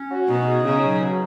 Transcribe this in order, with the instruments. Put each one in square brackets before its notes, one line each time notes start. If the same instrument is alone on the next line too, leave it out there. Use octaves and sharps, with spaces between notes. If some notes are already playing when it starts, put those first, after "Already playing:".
Already playing: [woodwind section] C#4
F#4
[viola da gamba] B2 [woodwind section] D#4
[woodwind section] G#4
[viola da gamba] C#3 [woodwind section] D#4
[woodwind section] F#3
B2